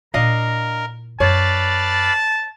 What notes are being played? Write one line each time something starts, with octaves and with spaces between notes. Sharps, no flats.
A#2 D4 E4 A#4 D#5 F5
F#2 B4 C#5 D5 F5 A5